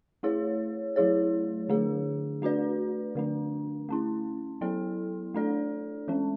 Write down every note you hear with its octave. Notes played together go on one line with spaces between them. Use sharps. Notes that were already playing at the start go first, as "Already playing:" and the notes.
A3 E4 G#4 C#5
F#3 A3 E4 G#4 C#5
D3 A3 D4 G#4
A3 D4 F#4 B4 D5
D3 A3 D4
A3 C#4 E4
F#3 B3 E4 A4
A3 D4 A4 D5
E3 G#3 C#4